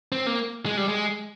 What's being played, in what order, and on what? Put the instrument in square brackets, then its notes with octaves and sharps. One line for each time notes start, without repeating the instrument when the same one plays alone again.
[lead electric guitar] C4
A#3
G#3
G3
G#3